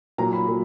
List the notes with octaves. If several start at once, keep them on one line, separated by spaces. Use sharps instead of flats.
A#2 F#3 A#3 A#5
B5
A#2 F#3